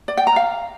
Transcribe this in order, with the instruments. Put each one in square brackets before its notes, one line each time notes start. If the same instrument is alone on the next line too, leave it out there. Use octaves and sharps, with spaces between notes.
[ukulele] D5
G5
A#5
F5